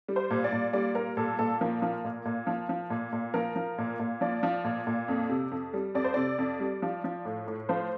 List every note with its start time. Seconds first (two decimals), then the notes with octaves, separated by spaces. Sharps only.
0.08 G3
0.16 C5
0.30 A#2
0.44 D5
0.52 A#2
0.73 G3 D5
0.95 G3 A#4
1.17 A#2 A4
1.39 A#2 A4
1.61 F3 A#4
1.82 F3
2.04 A#2
2.25 A#2
2.47 F3
2.69 F3
2.90 A#2
3.12 A#2
3.34 F3 A#4
3.56 F3
3.78 A#2
3.99 A#2
4.21 F3 D5
4.43 F3
4.64 A#2
4.87 A#2
5.08 F2
5.29 C3
5.51 F2
5.73 G3
5.95 F2 D5
6.04 C5
6.14 C3 D5
6.39 F2
6.60 G3
6.82 F3
7.04 F3
7.25 A2
7.47 A2
7.69 F3 C5